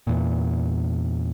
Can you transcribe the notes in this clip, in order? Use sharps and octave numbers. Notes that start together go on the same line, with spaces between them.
E2 A#2